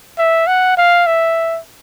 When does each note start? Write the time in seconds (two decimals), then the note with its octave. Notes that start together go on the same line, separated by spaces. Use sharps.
0.18 E5
0.47 F#5
0.77 F5
1.07 E5